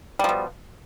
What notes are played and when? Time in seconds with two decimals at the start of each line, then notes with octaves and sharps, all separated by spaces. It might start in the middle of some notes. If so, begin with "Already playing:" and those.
0.19 G3
0.24 F3
0.29 B2